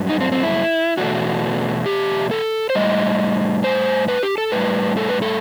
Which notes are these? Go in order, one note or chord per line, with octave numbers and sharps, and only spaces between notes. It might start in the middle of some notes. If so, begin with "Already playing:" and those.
Already playing: G2 F#3 A3
D#4
C4
C4
E4
E2 B2 A3 F#4
G4
A4
C5
A2 G3 D#5
C5
B4
G4
A4
A2 G3 B4
A4
B4
A4